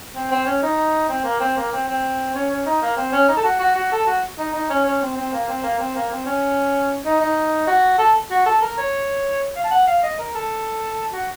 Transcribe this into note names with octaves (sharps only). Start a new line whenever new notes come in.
C4
C4
C#4
D#4
C4
A#3
C4
A#3
C4
C4
C#4
C#4
D#4
A#3
C4
C#4
D#4
A4
F#4
F#4
F#4
A4
F#4
D#4
D#4
C#4
C#4
C4
C4
A#3
C4
A#3
C4
A#3
C4
C#4
D#4
D#4
F#4
A4
F#4
A4
A#4
C#5
F5
A5
F#5
F5
D#5
A#4
A4
F#4